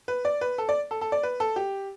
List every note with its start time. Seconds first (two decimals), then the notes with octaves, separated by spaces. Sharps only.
0.08 B4
0.25 D5
0.41 B4
0.58 A4
0.69 D5
0.91 A4
1.01 A4
1.12 D5
1.23 B4
1.40 A4
1.56 G4